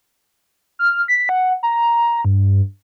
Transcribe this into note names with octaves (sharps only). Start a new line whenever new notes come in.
F6
B6
F#5
A#5
G2